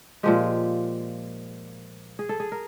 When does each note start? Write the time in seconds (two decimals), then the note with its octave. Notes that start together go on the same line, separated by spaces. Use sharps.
0.23 A#2 F3 G#3 G4
2.19 G#4
2.29 A4
2.40 G#4
2.52 A#4